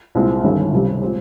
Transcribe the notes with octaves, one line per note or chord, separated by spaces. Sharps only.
C2 A#2 G#3 C4
G1 G2 D#3 G3 C#4
C#2 C3 G3
A#2 G#3 C4 G4